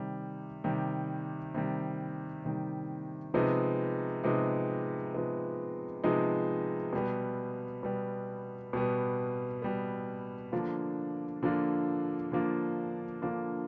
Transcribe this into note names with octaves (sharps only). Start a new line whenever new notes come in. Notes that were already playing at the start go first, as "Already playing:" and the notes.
Already playing: C3 D#3 G3
C3 D#3 G3
C3 D#3 G3
C3 D#3 G3
C3 F3 G#3 B3 D#4
C3 F3 G#3 B3 D#4
C3 F3 G#3 B3 D#4
C3 F3 G#3 B3 D#4
B2 G3 B3
B2 G3 B3
B2 G3 B3
B2 G3 B3
D3 F3 A#3 D4 F4
D3 F3 A#3 D4 F4
D3 F3 A#3 D4 F4
D3 F3 A#3 D4 F4